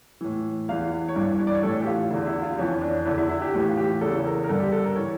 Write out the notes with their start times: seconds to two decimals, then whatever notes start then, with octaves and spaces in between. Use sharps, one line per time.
0.21 A2 E3
0.68 E2 E3 F5
1.08 C#5
1.16 G2 E3 D5
1.40 C#5
1.47 D5
1.55 C#5
1.63 A2 E3 A4
1.82 G4
1.87 F4
2.10 E2 D3 E4
2.27 E4
2.42 F4
2.58 F2 E3 C#4
2.75 C#4
2.82 D4
3.05 E2 D3 E4
3.18 E4
3.29 E4
3.42 G4
3.53 A2 E3 G4
3.69 F4
3.77 G4
4.01 E2 C#3 E3 A4
4.25 A#4
4.44 A#4
4.49 G2 D3 A4
4.60 G4
4.72 A4
4.84 A#4
4.96 E3 C#5